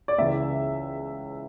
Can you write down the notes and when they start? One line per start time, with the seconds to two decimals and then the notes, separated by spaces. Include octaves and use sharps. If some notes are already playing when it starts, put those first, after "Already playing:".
0.08 D5
0.18 C#2 C#3 E3 E5